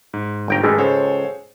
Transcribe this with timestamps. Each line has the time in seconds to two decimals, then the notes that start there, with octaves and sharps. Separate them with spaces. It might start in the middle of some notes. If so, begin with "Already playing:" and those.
0.14 G#2
0.48 G1 G5 A#5
0.64 D#3 E3 G#3 A3
0.78 C#2 A4 C5 C#5